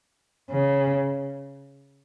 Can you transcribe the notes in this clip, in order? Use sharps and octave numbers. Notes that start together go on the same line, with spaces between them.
C#3